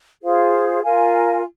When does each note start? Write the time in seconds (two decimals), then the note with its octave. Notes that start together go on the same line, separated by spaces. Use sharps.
0.22 F4 G#4 C5 F5
0.83 F4 A#4 F5 G#5